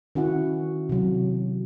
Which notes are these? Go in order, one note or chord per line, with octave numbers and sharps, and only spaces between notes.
D#3 C#4 E4 F#4 F#5
C3 F#3